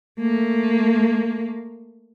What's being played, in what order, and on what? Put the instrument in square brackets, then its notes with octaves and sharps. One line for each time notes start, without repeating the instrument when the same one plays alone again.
[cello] A3 A#3